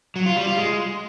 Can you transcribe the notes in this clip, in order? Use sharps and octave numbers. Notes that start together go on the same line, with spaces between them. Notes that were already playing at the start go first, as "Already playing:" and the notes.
F#3
F4
G3
F4
G#3